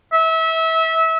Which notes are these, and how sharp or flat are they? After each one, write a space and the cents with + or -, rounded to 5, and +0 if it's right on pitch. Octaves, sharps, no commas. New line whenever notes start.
E5 -25